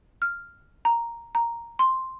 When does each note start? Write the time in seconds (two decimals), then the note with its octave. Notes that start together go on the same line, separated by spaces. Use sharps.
0.22 F6
0.85 A#5
1.35 A#5
1.79 C6